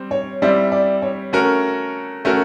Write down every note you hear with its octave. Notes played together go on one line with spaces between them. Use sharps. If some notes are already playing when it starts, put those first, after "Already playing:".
Already playing: G3 C4
C#5
G3 C4 E4 D5
D5
C#5
A3 C#4 F#4 A#4
A3 C#4 F#4 A#4